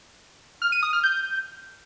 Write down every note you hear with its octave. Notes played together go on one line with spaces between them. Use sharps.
F6
D#7
D#6
F6
G6